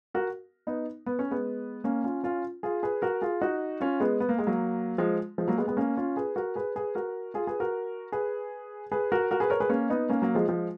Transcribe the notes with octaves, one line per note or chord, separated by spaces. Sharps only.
F#4 A#4
B3 D#4
B3
C#4
G#3 B3
A#3 C#4
C#4 F4
C#4 F4
F4 G#4
G#4 B4
F#4 A#4
F4 G#4
D#4 F#4
C#4 F4
G#3 B3
B3
A#3
G#3
F#3 A#3
F3 G#3
F3 G#3
F#3 A#3
G#3 B3
G#3 B3
A#3 C#4
C#4 F4
G#4 B4
F#4 A#4
G#4 B4
G#4 B4
F#4 A#4
F4 G#4
G#4 B4
F#4 A#4
G#4 B4
G#4 B4
F#4 A#4
F#4 A#4
G#4 B4
A#4 C#5
G#4 B4
A#3 C#4
B3 D#4
A#3 C#4
F#3 A#3
F3 G#3
F3 G#3